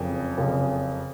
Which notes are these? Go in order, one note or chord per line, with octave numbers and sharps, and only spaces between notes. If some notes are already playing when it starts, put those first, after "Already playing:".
Already playing: F#1 F2 C#3
F#1 F2 C#3